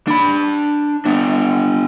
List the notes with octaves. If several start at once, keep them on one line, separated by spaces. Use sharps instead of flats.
D4 B5
B3 D4